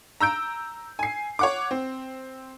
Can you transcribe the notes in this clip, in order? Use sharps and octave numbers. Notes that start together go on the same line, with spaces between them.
A#5 E6 G6 D7
G#5 C7
C#5 F#5 D6
C4